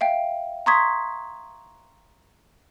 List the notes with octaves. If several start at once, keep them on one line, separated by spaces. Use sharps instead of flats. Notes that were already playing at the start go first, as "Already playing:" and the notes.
E5 F5 G5
A#5 C6 C#6 D#6 G#6 B6